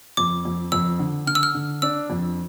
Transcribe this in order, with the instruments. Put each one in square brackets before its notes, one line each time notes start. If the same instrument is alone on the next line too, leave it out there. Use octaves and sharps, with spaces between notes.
[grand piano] F2 [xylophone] D6
[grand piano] F2
[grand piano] F2 [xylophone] E6
[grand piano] D3
[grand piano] D3 [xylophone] F6
[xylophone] E6
F6
[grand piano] D3
[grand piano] D4 [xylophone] E6
[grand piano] F2